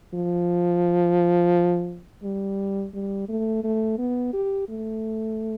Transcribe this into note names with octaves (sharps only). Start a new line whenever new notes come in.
F3
G3
G3
A3
A3
B3
G4
A3